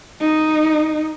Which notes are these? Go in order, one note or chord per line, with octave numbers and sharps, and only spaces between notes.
D#4